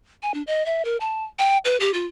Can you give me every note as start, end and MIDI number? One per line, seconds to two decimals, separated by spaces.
0.23 0.34 80
0.34 0.42 62
0.47 0.65 75
0.66 0.83 76
0.85 0.97 70
1.00 1.24 81
1.39 1.57 79
1.65 1.77 71
1.80 1.91 67
1.94 2.06 65